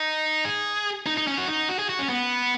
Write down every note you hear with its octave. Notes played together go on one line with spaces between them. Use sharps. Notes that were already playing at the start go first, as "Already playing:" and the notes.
Already playing: D#4
G#4
D#4
D#4
C#4
F#4
D#4
F#4
G#4
F#4
C#4
B3